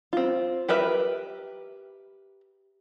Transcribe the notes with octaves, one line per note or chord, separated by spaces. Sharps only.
C4 F4
G4 A#4 B4 E5